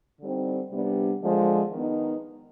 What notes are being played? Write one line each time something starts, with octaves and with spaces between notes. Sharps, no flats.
D3 G3 C4 D#4
C3 G3 B3 D4
D3 F3 G#3
D#3 B3 D#4